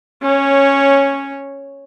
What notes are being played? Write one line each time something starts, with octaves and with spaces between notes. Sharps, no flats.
C#4 C#5